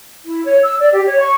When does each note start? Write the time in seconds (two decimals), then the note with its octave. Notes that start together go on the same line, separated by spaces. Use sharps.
0.25 E4
0.45 C#5
0.63 E6
0.79 D5
0.92 G4
1.06 C#5
1.19 C#6